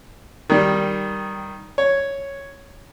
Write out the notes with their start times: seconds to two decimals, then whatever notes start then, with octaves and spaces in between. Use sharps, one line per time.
0.50 D#3 G3
1.78 C#5